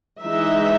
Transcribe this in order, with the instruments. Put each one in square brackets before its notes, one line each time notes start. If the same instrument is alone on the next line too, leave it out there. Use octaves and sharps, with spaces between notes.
[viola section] E3 G#3 D#4 E5